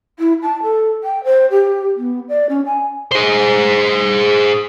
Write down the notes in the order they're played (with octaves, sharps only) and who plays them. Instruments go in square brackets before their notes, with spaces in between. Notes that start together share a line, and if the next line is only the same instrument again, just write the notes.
[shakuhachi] E4
A5
A4
G5
C5
G4
B3
D5
C#4
G#5
[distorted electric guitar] G#4 C5